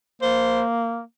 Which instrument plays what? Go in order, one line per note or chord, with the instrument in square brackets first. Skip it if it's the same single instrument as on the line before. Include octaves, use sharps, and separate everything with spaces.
[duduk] A#3 [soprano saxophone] C5